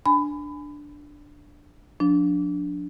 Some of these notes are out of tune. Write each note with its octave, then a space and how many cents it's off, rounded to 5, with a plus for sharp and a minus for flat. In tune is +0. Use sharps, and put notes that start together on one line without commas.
D4 +0 G#5 +0 B5 +25
F3 +35 D4 -10